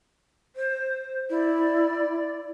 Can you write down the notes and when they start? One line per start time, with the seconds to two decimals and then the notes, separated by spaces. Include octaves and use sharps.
0.56 C5
1.30 E4 D5